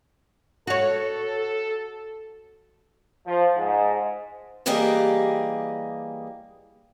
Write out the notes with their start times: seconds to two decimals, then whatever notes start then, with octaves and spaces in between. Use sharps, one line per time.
0.67 F#4 A4 C#5
3.26 F3
3.56 G#2
4.66 E3 G3 A#3 G4 G#4 D#5